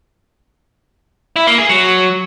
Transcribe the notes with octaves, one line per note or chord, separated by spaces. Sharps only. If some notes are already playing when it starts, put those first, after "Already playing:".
E4
A#3
G#4
F#3